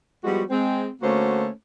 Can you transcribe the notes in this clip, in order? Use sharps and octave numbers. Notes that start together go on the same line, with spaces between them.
F3 G3 G#3 B3 F#4
G#3 C4
D3 A3 A#3 C#4 F#4 C5